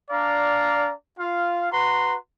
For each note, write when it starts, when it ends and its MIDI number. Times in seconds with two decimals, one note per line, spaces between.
0.11 0.93 62
0.11 0.93 74
0.11 0.93 77
0.11 0.93 82
1.19 1.70 65
1.19 1.70 77
1.72 2.16 66
1.72 2.16 71
1.72 2.16 82
1.72 2.16 84